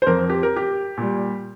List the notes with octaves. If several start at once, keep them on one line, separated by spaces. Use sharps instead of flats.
C5
F2 F3 A#4
G4
A#4
G4
A#2 G3